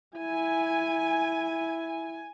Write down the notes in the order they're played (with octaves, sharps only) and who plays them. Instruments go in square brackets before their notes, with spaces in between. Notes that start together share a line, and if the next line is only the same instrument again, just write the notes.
[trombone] E4 [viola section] G#5